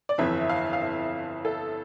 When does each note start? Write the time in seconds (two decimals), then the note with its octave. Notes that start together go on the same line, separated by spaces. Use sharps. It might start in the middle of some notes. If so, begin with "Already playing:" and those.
0.09 D5
0.18 G1 F2 E3 E5
0.49 F5
0.73 F5
0.81 E5
1.45 A4